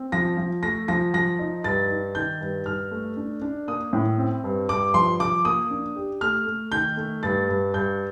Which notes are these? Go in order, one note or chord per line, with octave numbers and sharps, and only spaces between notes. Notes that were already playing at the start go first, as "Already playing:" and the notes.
Already playing: C4
F3 A#6
F3
A3 A#6
F3 A#6
F3 A#6
D#4
G2 A6
D#4
D#3 G6
G2
G2 F6
A3
D4
D4
A#3 D#6
A2
C4
G2
G2 D6
F3 C6
F3 D6
A#3 D#6
D4
G4
A3 F6
A3
D#3 G6
A3
G2 A6
G2
G2 G6